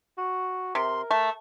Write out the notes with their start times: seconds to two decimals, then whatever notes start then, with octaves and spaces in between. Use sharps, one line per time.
0.18 F#4
0.75 C3 A#4 C6
1.11 A3 A5